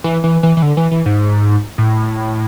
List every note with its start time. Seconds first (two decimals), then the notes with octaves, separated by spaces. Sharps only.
0.04 E3
0.24 E3
0.43 E3
0.57 E3
0.62 D3
0.77 E3
0.91 E3
1.06 G#2
1.78 A2